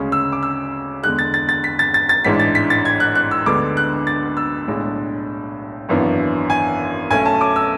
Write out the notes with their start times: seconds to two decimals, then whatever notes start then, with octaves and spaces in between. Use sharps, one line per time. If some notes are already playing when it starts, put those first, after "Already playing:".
Already playing: D2 C#3 G#3 C#4
0.12 E6
0.32 D6
0.43 E6
1.03 E2 D3 G#3 F#6
1.19 A6
1.34 A6
1.49 A6
1.64 B6
1.79 A6
1.94 A6
2.09 A6
2.24 A1 G#2 E3 G#3 D4 B6
2.40 A6
2.55 B6
2.70 A6
2.85 G#6
3.00 F#6
3.15 F#6
3.31 E6
3.46 D2 D3 G#3 B3 D4 D6
3.77 F#6
4.07 A6
4.37 E6
4.68 B1 A2 G#3 D4
5.89 G#1 F#2 E3 B3 D4
6.50 G#5
7.11 B1 B2 A3 C#4 G#5
7.25 A5
7.41 D6
7.56 E6